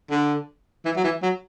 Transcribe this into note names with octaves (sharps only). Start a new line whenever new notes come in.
D3
E3
F#3
E3
F#3